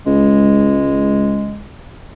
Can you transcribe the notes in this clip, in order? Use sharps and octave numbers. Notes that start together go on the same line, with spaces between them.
C#2 G#3